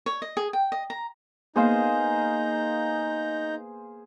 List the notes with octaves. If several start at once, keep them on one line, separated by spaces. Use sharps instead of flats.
C#5
D#5
G#4
G5
D#5
A#5
A#3 B3 D#4 G#4 C5 F5 A#5 G6